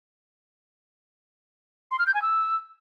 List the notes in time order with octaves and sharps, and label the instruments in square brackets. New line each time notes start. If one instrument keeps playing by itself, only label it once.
[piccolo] C6
F6
G6
G#5
E6